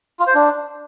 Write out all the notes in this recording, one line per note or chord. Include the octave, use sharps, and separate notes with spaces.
F4
C5
D4